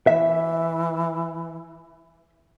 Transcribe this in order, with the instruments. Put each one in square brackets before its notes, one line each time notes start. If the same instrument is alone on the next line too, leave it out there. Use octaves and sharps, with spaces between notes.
[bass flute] E3 [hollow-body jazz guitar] E5